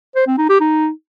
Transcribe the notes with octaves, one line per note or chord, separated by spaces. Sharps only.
C5
C4
D#4
G4
D#4